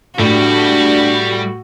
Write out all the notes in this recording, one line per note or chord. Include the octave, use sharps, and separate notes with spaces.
A2 G3 D4 F#4